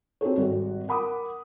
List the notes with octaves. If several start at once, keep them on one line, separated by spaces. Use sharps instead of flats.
C4 D#4 F#4 G#4 A4 C#5
G#1 G3 F#4
A#4 F#5 B5 D6 D#6